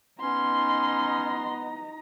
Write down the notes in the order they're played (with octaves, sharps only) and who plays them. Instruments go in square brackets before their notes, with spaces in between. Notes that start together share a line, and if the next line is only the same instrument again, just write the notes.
[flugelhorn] B3 [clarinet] C#4 [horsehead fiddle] D#4 A#5 [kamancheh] C6